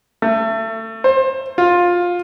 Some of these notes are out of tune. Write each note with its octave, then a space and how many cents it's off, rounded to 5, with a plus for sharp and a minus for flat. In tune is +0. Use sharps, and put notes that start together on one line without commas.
A3 +25
C5 +30
F4 +15